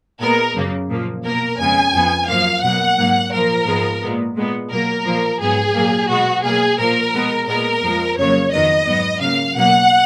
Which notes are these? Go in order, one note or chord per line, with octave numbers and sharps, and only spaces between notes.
A#2 G#3 B3 A#4
F#2 C#3 F#3 A#3
A#2 F3 A#3
B2 A#3 A#4
F2 C#3 G#3 B3 G#5
F2 F3 B3
F#2 F3 A#3 F5
B2 F#3 A#3 F#5
G#2 F#3 A#3
A#2 F3 A#3 A#4
G#2 F3 G#3 B3
A#2 G#3 B3
A#2 G#3 B3
B2 F#3 A#3 A#4
A#2 F3 A#3
G#2 F#3 B3 G#4
A#2 F#3 A#3
B2 G#3 B3 F#4
B2 F#3 A#3 G#4
A#2 F3 A#3 A#4
B2 G#3 B3
A#2 G#3 B3 A#4
F2 F3 G#3
F2 C#3 F#3 A#3 C#5
F2 D#3 F#3 B3 D#5
G#2 F#3 B3
C#3 F#3 A#3 F5
B2 F#3 A#3 F#5